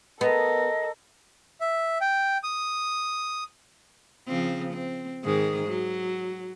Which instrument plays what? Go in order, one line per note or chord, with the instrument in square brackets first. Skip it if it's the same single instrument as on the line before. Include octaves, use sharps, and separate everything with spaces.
[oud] B3 [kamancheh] A4 A#4 [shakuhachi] D#5
[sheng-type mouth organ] E5
G5
D#6
[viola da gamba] C#3 F3 C4
C4
G#2 D#3 G#4
F#3